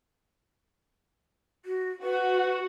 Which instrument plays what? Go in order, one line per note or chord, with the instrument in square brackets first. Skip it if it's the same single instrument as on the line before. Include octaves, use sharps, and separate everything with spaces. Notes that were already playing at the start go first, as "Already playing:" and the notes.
[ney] F#4
[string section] F#4 [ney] B4